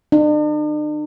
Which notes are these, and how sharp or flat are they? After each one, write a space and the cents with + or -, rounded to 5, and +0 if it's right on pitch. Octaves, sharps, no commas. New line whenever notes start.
D4 +45